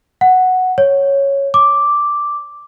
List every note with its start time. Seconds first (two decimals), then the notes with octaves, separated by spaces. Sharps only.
0.21 F#5
0.78 C#5
1.54 D6